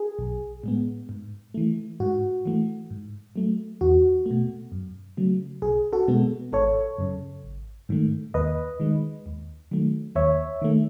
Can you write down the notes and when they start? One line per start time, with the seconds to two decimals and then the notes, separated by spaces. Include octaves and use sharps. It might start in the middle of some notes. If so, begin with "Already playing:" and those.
Already playing: G#4
0.19 B1
0.64 A2 G#3 B3
1.09 G#2
1.54 E3 A3
2.00 G#2 F#4
2.45 E3 A3
2.90 G#2
3.36 F#3 A3
3.81 E2 F#4
4.26 B2 A3
4.72 F#2
5.17 C#3 F#3 A3
5.62 B1 G#4
5.93 F#4 A4
6.08 B2 G#3 B3
6.53 G#1 A4 C#5
6.98 F#2 C#3
7.44 G#1
7.89 G#2 D#3 A3
8.34 D#2 B4 D#5
8.80 D#3 G#3
9.26 D#2
9.71 D#3 F#3 A3
10.15 D#2 C#5 E5
10.62 D#3 A3